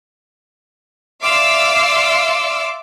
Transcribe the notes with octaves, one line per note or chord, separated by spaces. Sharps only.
D5 E5 F5 C6 D6 E6